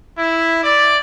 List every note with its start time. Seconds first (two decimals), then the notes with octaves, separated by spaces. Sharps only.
0.19 E4
0.64 D5